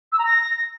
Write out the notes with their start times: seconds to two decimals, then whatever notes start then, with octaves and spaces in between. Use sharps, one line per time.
0.12 E6
0.19 A#5
0.25 A#6